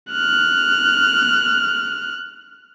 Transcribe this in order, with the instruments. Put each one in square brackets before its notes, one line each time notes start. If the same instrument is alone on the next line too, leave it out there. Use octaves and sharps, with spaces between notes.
[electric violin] F6 F#6